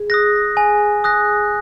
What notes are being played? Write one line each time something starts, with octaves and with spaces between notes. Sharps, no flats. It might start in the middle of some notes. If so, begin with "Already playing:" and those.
Already playing: G#4
D#6 F#6 A#6
G#5
D#6 F#6 A#6